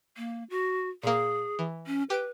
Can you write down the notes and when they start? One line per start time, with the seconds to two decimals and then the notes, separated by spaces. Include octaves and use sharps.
0.17 A#3
0.50 F#4
1.03 A#2 A#3 G#4
1.59 E3
1.87 C#4
2.10 G4 B4 D7